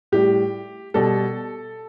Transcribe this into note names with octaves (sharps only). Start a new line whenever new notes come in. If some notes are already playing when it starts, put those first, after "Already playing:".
A2 G3 G4
B2 G3 A4